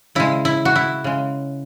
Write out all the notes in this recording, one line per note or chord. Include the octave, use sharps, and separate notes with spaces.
C#3 G#3 E4
E4
F#4
E4
C#3 G#3